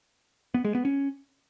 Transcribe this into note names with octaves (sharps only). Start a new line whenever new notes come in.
B3
G#3
B3
C#4